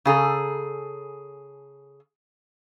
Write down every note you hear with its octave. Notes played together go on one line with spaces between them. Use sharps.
C#3 G#4 A4 A#5